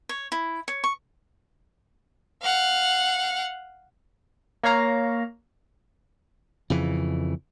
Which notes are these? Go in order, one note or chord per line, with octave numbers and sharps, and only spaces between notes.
C#5
E4
C#5
C#6
F5 F#5
A#3 C#5 F5 A#5
F2 C#3 E3